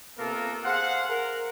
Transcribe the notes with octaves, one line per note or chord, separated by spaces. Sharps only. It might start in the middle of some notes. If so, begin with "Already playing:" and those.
C3 A#3 B3 F4 A4 A#4
G#4 C5 F5 F#5
A#4